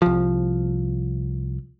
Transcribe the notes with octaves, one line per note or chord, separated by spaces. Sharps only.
C2 F3